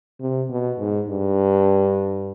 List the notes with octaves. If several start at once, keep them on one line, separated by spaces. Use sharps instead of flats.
C3
B2
G#2
G2